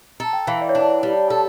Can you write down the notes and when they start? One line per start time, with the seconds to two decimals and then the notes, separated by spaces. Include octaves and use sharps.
0.20 A4 A#5
0.33 G5
0.47 E3 F5
0.61 D5
0.69 C#5
0.75 D4 D5
1.03 G3
1.30 A4